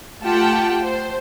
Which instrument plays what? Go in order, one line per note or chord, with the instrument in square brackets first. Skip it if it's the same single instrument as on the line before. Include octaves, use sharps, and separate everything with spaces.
[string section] A3 F4 G4 F#5 G5 A5
C5